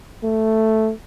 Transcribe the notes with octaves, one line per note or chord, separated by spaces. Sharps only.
A3